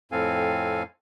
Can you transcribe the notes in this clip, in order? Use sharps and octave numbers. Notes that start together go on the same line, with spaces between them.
F2 A2 C4 A4 F5 G#5